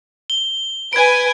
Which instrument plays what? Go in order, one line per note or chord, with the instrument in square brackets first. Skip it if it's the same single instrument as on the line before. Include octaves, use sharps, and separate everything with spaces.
[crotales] G7
[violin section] B4 G#5 [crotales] G#6 D7